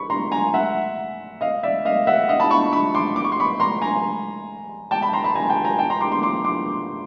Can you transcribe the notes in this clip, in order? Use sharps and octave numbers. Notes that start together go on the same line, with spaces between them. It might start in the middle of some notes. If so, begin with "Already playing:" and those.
Already playing: B5 C#6
A#5 C6
G#5 A#5
E5 F#5
D#5 F5
D5 E5
D#5 F5
E5 F#5
D#5 F5
A5 B5
B5 C#6
B5 C#6
C6 D6
D6
C#6
C6
B5 C#6
A#5 C6
G#5 A#5
G5 A5
A5 B5
A#5 C6
A5 B5
G#5 A#5
G5 A5
G#5 A#5
G5 A5
A#5 C6
C6 D6
C6 D6
C6 D6
C6 D6